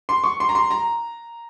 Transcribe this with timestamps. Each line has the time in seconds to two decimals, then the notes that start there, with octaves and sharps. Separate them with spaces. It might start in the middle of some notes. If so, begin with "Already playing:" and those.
0.09 C6
0.24 C#6
0.40 C6
0.49 A#5
0.55 C6
0.71 A#5